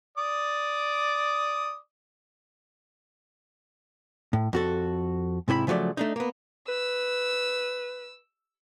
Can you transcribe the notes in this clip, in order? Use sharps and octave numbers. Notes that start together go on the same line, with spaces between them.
D5 D6 D#6
A2
F2 F#4 A4
G#2 C3 E4 C5 B5
C#3 F3 F#3 A3 D5
A3 D4 D#4
A#3 B3
B4 E6